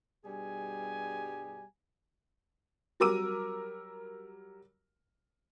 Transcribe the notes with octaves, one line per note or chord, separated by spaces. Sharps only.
G2 B2 G3 G#4 G#5
F#3 G3 A#4 D6 E6 D#7